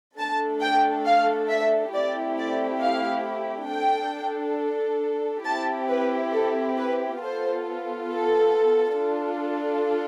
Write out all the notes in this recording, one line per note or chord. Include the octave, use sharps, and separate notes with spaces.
A3 D4 A4 A5
G5
F5
E5
A3 C4 E4 G4 D5
D5
F5
D4 A4 G5
C4 E4 G4 A5
B4
A4
B4
B3 F4 A4 C5
A4
D4 F4 A4